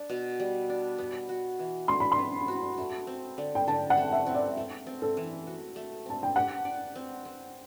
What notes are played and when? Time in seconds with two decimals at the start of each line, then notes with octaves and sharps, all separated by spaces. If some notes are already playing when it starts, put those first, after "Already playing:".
Already playing: D4
0.09 B2
0.40 G3
0.70 D4
0.98 B3
1.29 F#4
1.59 E3
1.88 E3 C6
2.00 B5
2.12 C6
2.18 B3
2.48 F#4
2.78 A3
3.07 C4
3.38 D3
3.55 G5
3.68 D3 A5
3.90 F#5
3.97 A3
4.12 E5
4.27 C4
4.34 D5
4.57 A3
4.87 C4
5.02 A4
5.17 E3
5.47 F#4
5.76 A3
6.06 C4 A5
6.23 G5
6.36 G4 F#5
6.65 D5
6.96 C4
7.25 C4